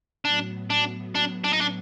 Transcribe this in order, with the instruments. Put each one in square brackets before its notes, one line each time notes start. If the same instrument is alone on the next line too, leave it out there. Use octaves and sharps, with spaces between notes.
[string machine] A2 F#3 B3 [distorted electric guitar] D4
[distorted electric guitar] D4
D4
D4
D#4
D4